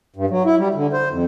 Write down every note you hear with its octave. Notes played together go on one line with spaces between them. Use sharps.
G2
F#3
E4
G3
D3
C5
F2